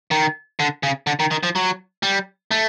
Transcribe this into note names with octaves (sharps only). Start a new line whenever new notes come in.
D#3
D3
C#3
D3
D#3
D#3
F3
F#3
G3
A3